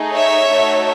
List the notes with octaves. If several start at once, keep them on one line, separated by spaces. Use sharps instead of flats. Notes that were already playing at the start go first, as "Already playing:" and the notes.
Already playing: A3 D#4 G#4
C#5 E5
A3 D#4 F#4 A4